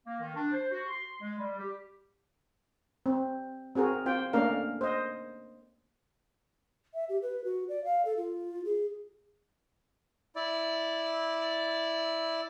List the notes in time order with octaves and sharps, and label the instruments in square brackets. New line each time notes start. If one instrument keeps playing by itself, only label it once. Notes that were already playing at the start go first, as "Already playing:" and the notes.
[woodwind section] A#3
D#3
D4
C5
F#4
C6
G#3
G3
G4
[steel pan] C4
C4 F#4 G#4 A#4
C4 F4 C5 G5
A3 A#3 C#4 D4 A#4 F5
C5 D#5
[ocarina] E5
G4
B4
F#4
D5
F5
A4
F4
G#4
[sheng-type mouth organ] E4 D5